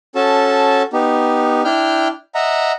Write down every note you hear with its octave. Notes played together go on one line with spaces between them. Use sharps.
C#4 F#4 A4 A5
B3 D#4 G4
D4 E4 G5 F6 G6
D#5 E5 F#5 A#5